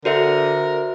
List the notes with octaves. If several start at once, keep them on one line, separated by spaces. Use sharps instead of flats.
D3 F#4 A#4 C5 E5